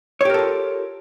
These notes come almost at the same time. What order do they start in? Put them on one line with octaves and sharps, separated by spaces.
C#5 G4 A#4 A4 F4